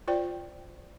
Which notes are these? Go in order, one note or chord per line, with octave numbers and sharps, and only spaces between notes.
F4 C5 D5 G5